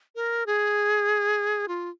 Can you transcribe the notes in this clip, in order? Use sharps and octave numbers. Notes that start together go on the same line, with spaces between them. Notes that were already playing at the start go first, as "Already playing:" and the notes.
A#4
G#4
F4